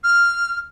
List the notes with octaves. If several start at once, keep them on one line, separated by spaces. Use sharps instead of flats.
F6